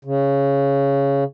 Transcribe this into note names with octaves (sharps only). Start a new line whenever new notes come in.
C#3